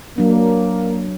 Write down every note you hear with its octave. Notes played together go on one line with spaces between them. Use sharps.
F#3 A#3 D4